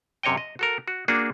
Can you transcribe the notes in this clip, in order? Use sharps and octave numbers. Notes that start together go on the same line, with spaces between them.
F#2 C3 C#5 D#5 G5
D#5
F#4 A4 A#4
F#4
A#3 D4 F#4 G#4